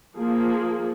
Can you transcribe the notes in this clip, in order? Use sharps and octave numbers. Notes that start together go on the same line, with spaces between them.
F3 A#3 G#4